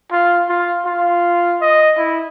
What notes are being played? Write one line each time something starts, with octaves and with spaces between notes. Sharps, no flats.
F4
F4
F4
D#5
E4